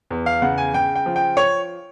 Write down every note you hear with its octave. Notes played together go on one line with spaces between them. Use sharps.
E2
F5
C#3 F#5
G#5
C#3 G5
G5
F3
G5
C#5